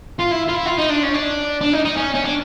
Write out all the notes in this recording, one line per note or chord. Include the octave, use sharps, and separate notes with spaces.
F4
E4
F4
E4
F4
D#4
D4
C#4
D4
D4
D#4
D#4
C#4
C#4
D4